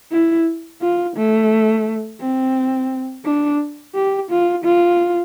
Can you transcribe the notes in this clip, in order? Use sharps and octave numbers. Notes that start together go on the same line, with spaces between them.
E4
F4
A3
C4
D4
G4
F4
F4